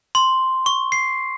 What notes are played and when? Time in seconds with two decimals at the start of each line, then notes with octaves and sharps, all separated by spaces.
0.15 C6
0.66 C#6
0.92 C7